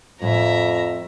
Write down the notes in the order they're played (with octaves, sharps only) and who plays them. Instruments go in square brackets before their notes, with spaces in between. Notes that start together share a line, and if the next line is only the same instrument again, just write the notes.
[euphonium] F2 [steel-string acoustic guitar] A2 [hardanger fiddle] E5 A#5